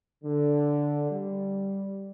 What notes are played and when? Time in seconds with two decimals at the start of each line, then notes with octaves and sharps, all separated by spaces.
0.23 D3
1.10 G3